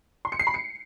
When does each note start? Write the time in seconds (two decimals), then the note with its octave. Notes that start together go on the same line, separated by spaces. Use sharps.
0.25 C6
0.32 C#7
0.39 C7
0.47 B5
0.54 C#7